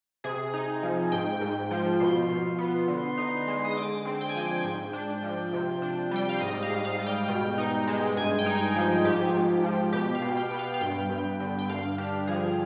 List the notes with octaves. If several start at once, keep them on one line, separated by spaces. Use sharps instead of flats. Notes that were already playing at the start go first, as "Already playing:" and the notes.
C3 G#4
D#4
F3
G#2 G5
G#2
F3
B2 C6
B2
B3
D3
D#4
G#3
D#6
D3 D6
C4
G5
G#5
F3 G5
G#2
D4
F3
C3
D4
G3 G5
F5
G#2 D#5
F5
G#2
F5
G3
G5
B2
D#4
G#3
G2 G#5
G5
D#4
F3
G#2 G4
G#2
F3
B2 G4
F5
B2
G5
B3
F5
F5
G2 G5
G2
D3
G5
G2 F5
D4 G4
F3 G#4